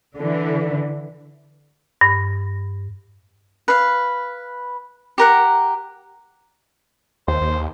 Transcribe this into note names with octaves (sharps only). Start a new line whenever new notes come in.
D3 E3
G2
B4 F5
G4 A#4 F#5
D#2 C5
D#2